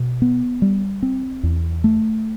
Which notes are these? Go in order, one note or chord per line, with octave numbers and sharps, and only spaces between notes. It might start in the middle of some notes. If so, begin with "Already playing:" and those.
Already playing: B2
B3
G3
C4
E2
A3